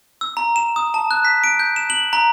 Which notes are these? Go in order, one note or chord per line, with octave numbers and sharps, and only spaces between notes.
E6
A#5
E7
D#6
A5
F#6
B6
D7
G6
E7
F#7
A#5